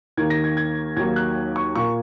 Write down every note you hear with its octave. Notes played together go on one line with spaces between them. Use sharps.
D#2 D#3 A#3 G#6
A#6
G#6
G#6
D#2 D#3 F#3 A#3 G#6
F#6
C#6
A#2 A#3 C#6